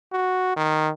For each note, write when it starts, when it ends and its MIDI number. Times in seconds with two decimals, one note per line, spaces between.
0.12 0.52 66
0.56 0.90 51